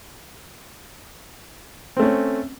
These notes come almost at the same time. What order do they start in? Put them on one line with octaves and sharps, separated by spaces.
C4 A3 C#4